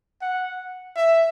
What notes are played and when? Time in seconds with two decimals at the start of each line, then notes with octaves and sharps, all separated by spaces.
0.22 F#5
0.96 E5